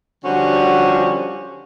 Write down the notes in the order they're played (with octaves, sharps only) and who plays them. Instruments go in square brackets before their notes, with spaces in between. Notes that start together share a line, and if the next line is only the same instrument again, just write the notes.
[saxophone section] D3 F3 G3 C#4 F#4 C5